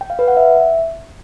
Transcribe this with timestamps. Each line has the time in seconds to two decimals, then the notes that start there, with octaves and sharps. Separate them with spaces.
0.01 G5
0.10 F5
0.19 B4
0.28 F#5
0.37 E5